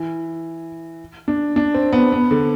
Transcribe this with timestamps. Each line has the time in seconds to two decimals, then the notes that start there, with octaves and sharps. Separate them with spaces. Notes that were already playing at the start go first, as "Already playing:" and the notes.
Already playing: E3
1.28 D4
1.56 D4
1.74 C4
1.93 B3
2.12 B3
2.31 D3